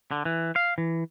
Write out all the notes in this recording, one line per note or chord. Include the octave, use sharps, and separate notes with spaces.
D3
E3
F5
E3